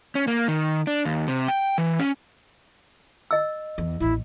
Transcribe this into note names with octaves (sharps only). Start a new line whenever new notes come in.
C#4
A#3
D#3
D4
D#2
C3
G5
E3
C#4
D#5 E6
E2
A1 D#2 E4